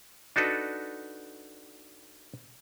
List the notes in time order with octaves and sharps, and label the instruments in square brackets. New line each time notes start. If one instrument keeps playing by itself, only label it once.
[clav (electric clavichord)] D4 D#4 F#4 A4 B4